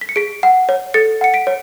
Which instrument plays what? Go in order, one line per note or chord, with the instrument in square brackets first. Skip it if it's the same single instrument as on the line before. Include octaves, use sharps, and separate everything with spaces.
[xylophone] B6
C#7
G#4 B6 D7
F#5
C#5
A4 A6 C#7
F#5 C#7
B6 D7
C#5